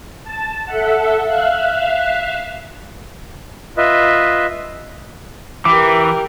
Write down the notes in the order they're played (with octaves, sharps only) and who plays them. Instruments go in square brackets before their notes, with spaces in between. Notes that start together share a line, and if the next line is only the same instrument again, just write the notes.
[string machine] A5
A4 E5 F#5
E5 F5 F#6
[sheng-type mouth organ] F4 B4 D#5 E5
[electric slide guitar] E3 [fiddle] G4 A#4 [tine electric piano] D6